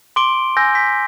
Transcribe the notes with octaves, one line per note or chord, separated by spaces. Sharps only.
C6 D6 D7 G7
G#5 E6 G6 A#6
B6